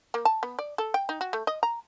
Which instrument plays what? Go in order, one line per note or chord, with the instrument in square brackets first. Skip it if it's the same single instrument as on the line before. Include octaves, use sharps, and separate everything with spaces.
[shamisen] A#3
A5
B3
D5
A4
G5
D#4
F#4
A3
D#5
A#5